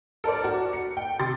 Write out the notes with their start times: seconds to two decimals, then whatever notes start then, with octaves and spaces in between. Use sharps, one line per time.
0.24 A4 A#4 C5 D5
0.44 F#4
0.73 C#7
0.97 G5
1.19 C3 C6 A6